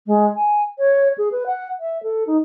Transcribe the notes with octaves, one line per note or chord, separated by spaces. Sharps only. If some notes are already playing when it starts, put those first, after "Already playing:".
G#3
G#5
C#5
G#4
B4
F#5
E5
A4
D#4